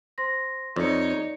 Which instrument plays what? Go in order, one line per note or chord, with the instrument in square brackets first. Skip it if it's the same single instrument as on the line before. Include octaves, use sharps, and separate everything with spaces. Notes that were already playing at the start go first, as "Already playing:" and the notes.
[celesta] C5 C6 A#6
[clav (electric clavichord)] F2 [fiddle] D#4 C#5 [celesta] D5 C#7